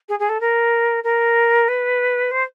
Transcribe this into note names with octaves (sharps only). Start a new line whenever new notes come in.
G#4
G#4
A4
A#4
A#4
B4
C5